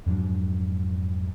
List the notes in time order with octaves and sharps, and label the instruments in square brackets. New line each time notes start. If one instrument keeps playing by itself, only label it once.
[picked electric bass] F2 G#2 F#3 D4